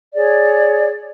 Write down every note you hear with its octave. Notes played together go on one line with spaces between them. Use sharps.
G#4 C#5 D5